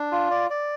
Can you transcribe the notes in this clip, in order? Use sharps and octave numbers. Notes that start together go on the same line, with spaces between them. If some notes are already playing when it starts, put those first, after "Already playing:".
Already playing: D4
F4
D5
D5